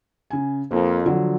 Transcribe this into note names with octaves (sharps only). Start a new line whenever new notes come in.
C#3 G#5
F2 A#3
D3 F3 F#3